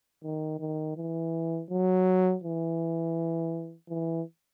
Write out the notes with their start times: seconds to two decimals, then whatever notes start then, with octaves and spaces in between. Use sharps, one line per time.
0.23 D#3
0.59 D#3
0.96 E3
1.70 F#3
2.43 E3
3.89 E3